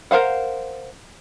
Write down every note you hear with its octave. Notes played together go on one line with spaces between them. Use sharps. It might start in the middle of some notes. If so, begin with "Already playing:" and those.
A#4 C5 F5 F#5